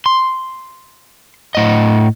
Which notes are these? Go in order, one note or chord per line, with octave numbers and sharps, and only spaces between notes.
C6
A2 D#5